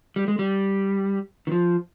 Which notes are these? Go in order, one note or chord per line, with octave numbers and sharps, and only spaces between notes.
G3
G#3
G3
D#3
F3